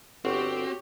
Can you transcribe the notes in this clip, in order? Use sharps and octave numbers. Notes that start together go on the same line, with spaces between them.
G1 C4 F#4 G4 C#5